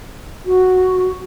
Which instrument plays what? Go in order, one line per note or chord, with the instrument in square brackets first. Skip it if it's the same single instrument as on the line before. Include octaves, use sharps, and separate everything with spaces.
[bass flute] F#4